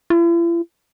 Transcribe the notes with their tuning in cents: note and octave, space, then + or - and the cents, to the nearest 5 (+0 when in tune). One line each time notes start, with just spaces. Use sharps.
E4 +45